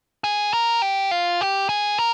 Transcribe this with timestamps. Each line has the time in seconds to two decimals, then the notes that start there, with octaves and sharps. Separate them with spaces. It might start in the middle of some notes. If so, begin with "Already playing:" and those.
0.24 G#4
0.53 A#4
0.82 G4
1.11 F4
1.41 G4
1.69 G#4
1.98 A#4